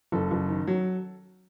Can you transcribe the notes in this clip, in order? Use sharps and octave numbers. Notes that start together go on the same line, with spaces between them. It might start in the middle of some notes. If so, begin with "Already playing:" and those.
F#1 A4
F#1
D#3
F#3